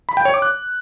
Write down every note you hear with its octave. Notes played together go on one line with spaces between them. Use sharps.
B5
G5
C#5
D6
F#6